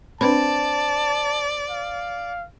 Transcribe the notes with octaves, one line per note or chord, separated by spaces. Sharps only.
C4 D4 B4 D5 A5 B5
F5